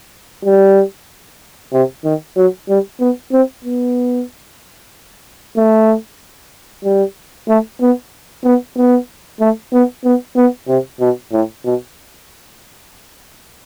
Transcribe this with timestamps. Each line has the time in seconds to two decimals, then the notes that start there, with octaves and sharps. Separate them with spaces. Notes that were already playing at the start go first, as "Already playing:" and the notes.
0.44 G3
1.73 C3
2.04 D#3
2.36 F#3
2.69 G3
3.00 B3
3.32 C4
3.64 B3
5.56 A3
6.84 G3
7.48 A3
7.81 B3
8.44 B3
8.76 B3
9.40 A3
9.73 B3
10.04 B3
10.36 B3
10.68 C3
11.00 B2
11.32 A2
11.64 B2